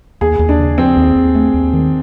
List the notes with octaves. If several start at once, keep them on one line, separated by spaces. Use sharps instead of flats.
D#2 G#4
D#2
D4
C#3
F3 C4
D#2
D#2
A3
D#2
D#3